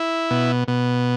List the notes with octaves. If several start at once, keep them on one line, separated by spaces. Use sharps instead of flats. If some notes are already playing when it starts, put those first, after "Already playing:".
Already playing: E4
B2
B2